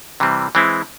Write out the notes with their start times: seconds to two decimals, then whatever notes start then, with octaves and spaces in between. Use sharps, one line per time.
0.20 C3 E3 G3 C4
0.55 E3 G#3 C4 E4